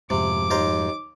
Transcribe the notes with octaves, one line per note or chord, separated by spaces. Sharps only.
F2 G#2 C3 D6
D#2 A#4 C5